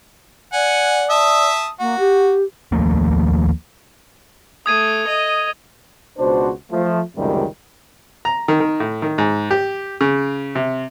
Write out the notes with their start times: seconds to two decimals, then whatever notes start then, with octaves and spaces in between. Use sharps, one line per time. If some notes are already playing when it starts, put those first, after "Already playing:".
0.53 D5 F#5 G#5
1.10 E5 A5 D#6
1.80 A#3 F#4
1.98 G4
2.72 D#2 F3 A3 A#3
4.66 A3 D#6 G#6 D#7
5.07 D#5
6.18 C#2 B2 D4 F#4 C5
6.71 F3 A3
7.17 C#2 F#2 C3 D#3 G3 A3
8.25 A#5
8.48 D#3
8.60 D#3
8.80 A2
9.02 D#3
9.18 G#2
9.51 G4
10.01 C#3
10.55 C3